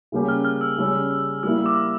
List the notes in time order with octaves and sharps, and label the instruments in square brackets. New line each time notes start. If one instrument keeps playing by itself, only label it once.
[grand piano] C#3 G3 A#3 C#4 G4
[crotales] F6
F6
E6
[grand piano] C#3 G3 C#4
[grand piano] G3 A#3 E4 [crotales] E6
[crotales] D6